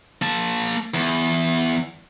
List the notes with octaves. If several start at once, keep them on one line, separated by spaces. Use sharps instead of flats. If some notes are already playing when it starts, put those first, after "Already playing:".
A#3 A5
E2